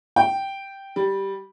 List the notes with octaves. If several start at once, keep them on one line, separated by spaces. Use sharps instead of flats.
G5
G3